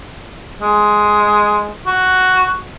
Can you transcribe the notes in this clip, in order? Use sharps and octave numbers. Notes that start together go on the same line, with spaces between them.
G#3
F#4